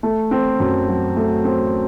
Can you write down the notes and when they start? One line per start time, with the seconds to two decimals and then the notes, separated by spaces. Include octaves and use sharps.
0.03 A3
0.31 C4
0.60 F#2
0.88 F#3
1.16 A3
1.45 C4